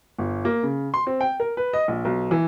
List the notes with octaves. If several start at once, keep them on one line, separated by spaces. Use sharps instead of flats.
G1
A#3
C#3
C6
C4
G5
A#4
B4
D#5
A#1
B1
E3